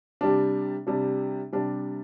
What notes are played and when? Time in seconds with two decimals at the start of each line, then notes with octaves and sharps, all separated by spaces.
0.21 C3 G3 D4
0.87 C3 G3 D4
1.53 C3 G3 D4